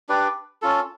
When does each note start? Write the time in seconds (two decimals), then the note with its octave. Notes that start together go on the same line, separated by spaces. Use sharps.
0.09 D4 G4 B4 D5
0.62 C#4 F4 A4